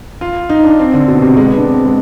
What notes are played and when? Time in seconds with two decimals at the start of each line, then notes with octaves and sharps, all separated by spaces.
0.21 F4
0.49 D#4
0.64 D4
0.79 C4
0.93 D3
1.08 B2
1.22 C3
1.37 G#3
1.47 B3
1.57 D4
1.66 C4
1.86 G#3